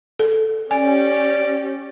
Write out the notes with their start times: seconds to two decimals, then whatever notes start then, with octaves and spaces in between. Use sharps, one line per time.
0.19 A4
0.71 C#4 G4 D5 G#5